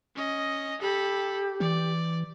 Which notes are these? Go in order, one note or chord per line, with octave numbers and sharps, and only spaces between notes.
C#4 D#5
G4 A4 B5
E3 D5